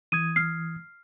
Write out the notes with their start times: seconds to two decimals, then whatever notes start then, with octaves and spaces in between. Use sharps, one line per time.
0.12 E3 D#6 G#6 D#7
0.36 F6 C7